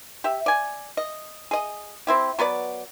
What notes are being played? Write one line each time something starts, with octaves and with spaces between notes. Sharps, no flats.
G4 E5
D5 G#5
D#5
G#4 D#5
C4 E4 G4
F#3 B3 B4 D5